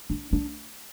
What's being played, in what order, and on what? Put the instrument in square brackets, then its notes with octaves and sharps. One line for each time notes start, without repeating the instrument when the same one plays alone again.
[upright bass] D4
D4